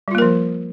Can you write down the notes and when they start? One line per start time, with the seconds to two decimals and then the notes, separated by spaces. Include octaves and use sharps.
0.08 G3
0.11 F4
0.15 A#3
0.18 A#4
0.22 F3